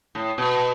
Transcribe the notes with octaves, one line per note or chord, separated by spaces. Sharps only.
A2
B2